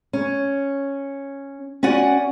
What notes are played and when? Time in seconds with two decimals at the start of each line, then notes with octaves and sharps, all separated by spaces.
0.13 C#4
1.83 C#4 F#4 D5 F#5 G#5